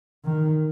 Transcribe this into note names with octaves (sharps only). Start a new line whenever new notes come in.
D#3